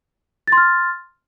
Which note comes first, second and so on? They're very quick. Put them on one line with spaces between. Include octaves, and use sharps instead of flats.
A6 C6 F6